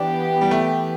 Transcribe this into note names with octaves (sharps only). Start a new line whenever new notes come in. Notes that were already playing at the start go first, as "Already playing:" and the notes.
Already playing: E3 B3 D4 G4
G3
A3